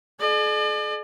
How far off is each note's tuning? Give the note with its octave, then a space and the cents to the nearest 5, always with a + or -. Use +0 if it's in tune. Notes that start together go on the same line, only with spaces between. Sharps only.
G#4 +45 D5 +40